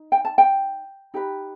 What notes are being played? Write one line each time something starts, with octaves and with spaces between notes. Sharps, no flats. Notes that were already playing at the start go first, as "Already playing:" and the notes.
Already playing: D#4
G5
A5
G5
D#4 G4 B4